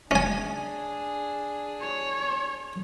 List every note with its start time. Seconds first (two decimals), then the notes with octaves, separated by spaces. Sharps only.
0.11 C#4 D4 G#4 G#5
1.81 C#5